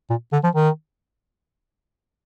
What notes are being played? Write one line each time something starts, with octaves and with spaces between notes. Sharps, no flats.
A#2
D3
F3
D#3